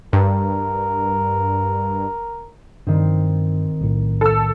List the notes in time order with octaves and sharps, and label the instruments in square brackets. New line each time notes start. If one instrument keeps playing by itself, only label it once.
[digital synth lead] G2 [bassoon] A#4
[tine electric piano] G2 [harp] D#3 C4
[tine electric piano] B1 A2
[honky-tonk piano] A4 E6